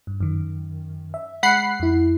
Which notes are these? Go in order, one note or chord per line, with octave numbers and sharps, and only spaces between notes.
G2
F#2 D#3
E5
G#3 F#5 B5 C7
F2 E4